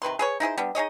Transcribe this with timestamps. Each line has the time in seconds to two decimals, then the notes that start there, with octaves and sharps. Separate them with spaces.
0.02 C3 D#3 B4 C6
0.19 G#4 B4 C#5
0.40 D#4 E4 G#4 C5
0.57 G3 B3 D4
0.75 D#4 G#4 C#5 D#5